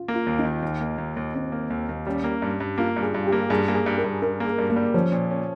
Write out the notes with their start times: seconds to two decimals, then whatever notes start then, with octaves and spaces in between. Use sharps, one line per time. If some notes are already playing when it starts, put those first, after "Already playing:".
Already playing: F4
0.08 A#3
0.14 F4
0.27 D#2
0.39 D#4
0.45 D#3
0.62 D#2
0.81 A#3
0.98 D#2
1.16 D#2
1.34 D#2 C4
1.52 A#3
1.70 D#2
1.89 D#2
2.07 G3 C#4
2.24 A#3
2.42 G2
2.60 G2
2.78 A#3 F4
2.96 G2
3.02 G#4
3.14 G2
3.27 G4
3.32 A#3
3.50 G2 G#4
3.68 A#3
3.75 G#4
3.86 G2
3.98 A#4
4.04 G2
4.22 G2 A#4
4.40 A#3
4.46 G#4
4.58 G2
4.70 A#3
4.76 G3
4.94 F3 C#4
5.12 A#2
5.30 C#4